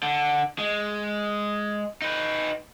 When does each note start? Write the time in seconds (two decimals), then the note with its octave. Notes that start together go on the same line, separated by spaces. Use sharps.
0.03 D3
0.58 G#3
2.02 D#4 B4